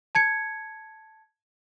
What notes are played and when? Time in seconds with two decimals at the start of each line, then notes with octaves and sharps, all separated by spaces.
0.15 A5 G#6 C#7